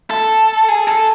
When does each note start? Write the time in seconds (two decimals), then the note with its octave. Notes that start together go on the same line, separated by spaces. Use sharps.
0.10 A4
0.68 G#4
0.87 A4